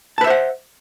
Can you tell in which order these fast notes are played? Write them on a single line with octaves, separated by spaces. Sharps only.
A5 B4 E5 C5 F#5